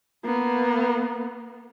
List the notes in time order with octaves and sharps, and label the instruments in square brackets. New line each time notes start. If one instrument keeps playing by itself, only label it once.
[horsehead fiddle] A#3 B3